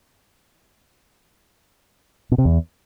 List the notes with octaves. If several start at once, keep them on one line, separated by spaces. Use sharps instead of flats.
B2
C3
E2